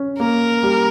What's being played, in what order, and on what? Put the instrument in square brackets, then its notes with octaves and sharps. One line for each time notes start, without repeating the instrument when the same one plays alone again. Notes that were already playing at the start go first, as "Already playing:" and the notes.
Already playing: [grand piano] C#4
[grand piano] A#3 [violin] A#4
[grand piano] G3